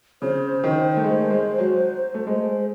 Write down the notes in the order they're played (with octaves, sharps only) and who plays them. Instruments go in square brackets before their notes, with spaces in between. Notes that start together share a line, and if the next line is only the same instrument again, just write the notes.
[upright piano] C#3 [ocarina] C5
[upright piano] D#3
A3
G#3
G#3
F#3
A3
G#3